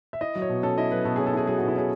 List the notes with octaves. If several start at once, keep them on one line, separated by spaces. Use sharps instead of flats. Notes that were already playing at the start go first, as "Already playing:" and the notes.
E5
E4 D#5
F#3
C#5
B2
C#4 A4
E4 D#5
F#3 B4
B2 A4
G#4
C#4
A4
E4 G#4
F#3 G#4
F#4
B2
E4
C#4 G#4